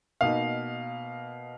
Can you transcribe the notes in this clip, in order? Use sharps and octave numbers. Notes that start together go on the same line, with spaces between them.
B2 A#3 D#4 F5